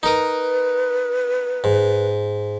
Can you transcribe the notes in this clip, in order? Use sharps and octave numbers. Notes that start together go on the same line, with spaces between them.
D#4 A#4 B4 D#6
G#2